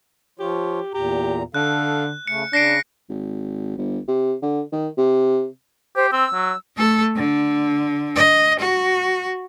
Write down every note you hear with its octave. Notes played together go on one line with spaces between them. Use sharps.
F3 F4 G4 C#5
E2 A#2 G4 A#5
D3 A4 F5 F#6
C#3 A3 C#7
C#3 D4 A#6 C7 D7
G#1
G1
C3
D3
D#3
C3
G4 C5
C4 E6
F#3
A3 A4
D3
D#5
F#4